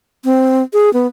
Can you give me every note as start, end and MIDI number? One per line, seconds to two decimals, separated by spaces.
0.25 0.63 60
0.73 0.92 68
0.94 1.07 59